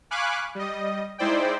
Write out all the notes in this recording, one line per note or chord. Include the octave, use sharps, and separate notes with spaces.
F5 G#5 B5 C#6 D6 F#6
G3 D#5
G#3 D#4 E4 C5 D5 G5